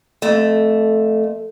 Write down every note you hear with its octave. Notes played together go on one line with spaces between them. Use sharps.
F2 A3